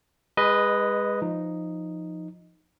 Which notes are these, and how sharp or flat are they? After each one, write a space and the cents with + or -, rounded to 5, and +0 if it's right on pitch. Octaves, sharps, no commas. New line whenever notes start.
G#3 -25 B4 +0 D#5 +0
F3 -5 D#4 +0